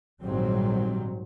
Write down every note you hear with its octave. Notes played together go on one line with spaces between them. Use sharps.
A#1 G#2 D#3 F#3 G3 C4